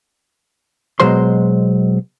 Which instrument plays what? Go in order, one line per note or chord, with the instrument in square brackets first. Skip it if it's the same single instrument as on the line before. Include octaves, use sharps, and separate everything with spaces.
[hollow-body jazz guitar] B2 F#3 G#3 C5 C6